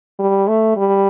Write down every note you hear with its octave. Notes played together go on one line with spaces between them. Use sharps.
G3
A3
G3